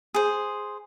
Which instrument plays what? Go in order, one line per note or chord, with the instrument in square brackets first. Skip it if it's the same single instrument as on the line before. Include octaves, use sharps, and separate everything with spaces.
[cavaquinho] G#4 C5